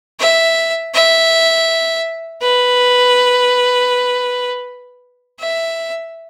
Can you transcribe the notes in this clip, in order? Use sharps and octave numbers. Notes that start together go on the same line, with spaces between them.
E5
E5
B4
E5